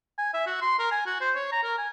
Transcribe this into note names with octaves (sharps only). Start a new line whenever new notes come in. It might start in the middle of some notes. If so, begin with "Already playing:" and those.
G#5
E5
F#4
C6
A#4
G#5
F#4
C5
C#5
A#5
A#4
G#5